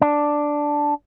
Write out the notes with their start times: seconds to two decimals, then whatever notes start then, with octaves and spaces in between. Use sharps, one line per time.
0.02 D4